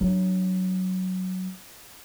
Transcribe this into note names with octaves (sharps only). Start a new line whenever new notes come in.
F#3 D4